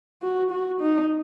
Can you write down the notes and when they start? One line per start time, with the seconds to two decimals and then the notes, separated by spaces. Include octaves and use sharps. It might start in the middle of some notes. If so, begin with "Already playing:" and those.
0.22 F#4
0.51 F#4
0.81 D#4